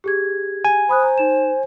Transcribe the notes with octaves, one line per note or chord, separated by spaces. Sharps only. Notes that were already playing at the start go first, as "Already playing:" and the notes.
G4 G#4 G#6
G#5
C5 B5 D#6 F#6
A#5
D#4 E7